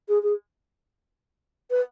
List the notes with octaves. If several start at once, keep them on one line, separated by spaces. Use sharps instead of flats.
G#4
G#4
B4